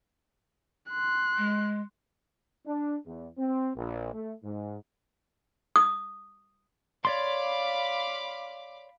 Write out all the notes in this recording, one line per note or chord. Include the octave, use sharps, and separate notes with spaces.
C6 F#6
G#3
D4
E2
C4
A#1
A3
G#2
D#6
C#5 D5 F5 B5 C6 D6